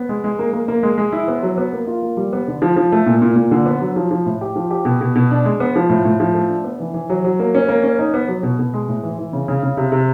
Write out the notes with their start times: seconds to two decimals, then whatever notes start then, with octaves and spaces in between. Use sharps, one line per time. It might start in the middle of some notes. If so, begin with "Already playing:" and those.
Already playing: B3
0.09 G#3
0.24 G#3
0.39 A#3
0.53 A#3
0.68 A#3
0.83 G#3
0.98 G#3
1.12 E4
1.28 B3
1.43 F#3
1.58 B3
1.73 A#3
1.87 F4
2.02 A#3
2.17 G3
2.33 B3
2.48 D3
2.62 F3
2.76 F3
2.92 A3
3.06 A#2
3.22 A#2
3.36 A#2
3.51 D3
3.66 B3
3.81 F#3
3.96 F3
4.11 F3
4.26 A2
4.41 G4
4.56 F3
4.71 G4
4.85 B2
5.01 B2
5.15 B2
5.31 D4
5.45 G#3
5.60 B3
5.76 F3
5.89 A2
6.05 A2
6.20 F3
6.34 A3
6.49 D4
6.64 B3
6.80 E3
6.94 E3
7.10 F#3
7.24 F#3
7.39 A#3
7.55 C#4
7.68 A#3
7.83 C#4
7.99 D#4
8.14 B3
8.28 F#3
8.43 B2
8.59 B2
8.74 G#3
8.89 A2
9.03 E3
9.18 E3
9.33 C#3
9.48 C#3
9.63 C#3
9.77 C3
9.92 C3